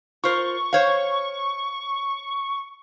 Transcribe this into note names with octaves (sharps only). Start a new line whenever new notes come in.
F4 A#4 C5 C#6
C5 C#5 F5